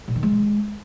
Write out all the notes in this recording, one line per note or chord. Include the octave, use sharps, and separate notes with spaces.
A#2
D#3
G#3